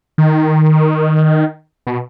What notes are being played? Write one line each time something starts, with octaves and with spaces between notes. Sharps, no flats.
D#3
B2